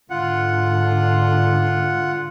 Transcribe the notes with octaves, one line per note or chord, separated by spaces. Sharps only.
G#2 D3 F4 F#5